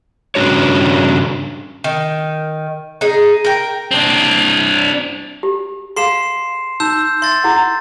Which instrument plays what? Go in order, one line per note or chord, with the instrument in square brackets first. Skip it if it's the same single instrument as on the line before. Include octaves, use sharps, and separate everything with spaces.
[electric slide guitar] G2 C#3 G3 D4 F#4 C#5
[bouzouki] D#3
D#4 G#4
A#4 G5
[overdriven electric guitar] C4 D4
[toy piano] G4
[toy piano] G#4 F5 [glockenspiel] C6 C7 E7
[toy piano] D#4 [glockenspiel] E6 G6 E7
[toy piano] E5 [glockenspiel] C6 A6
[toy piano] E4 G#4 F#5